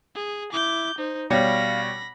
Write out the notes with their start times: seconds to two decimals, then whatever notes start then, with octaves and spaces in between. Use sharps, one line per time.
0.15 G#4
0.52 E4 D6 G6
0.98 D#4 C5
1.30 B2 G3 C#5 F5 B5 A#6